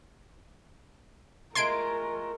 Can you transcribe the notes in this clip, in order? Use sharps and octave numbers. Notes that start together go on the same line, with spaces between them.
G#3 A3 F4 A#4 C6 G#6 D7